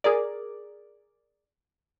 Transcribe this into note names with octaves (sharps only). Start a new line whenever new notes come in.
G#4 A#4 D5